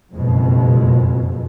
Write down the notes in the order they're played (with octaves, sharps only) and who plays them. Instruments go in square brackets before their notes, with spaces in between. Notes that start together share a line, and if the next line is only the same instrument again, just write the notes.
[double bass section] F#1 F2 B2 G#3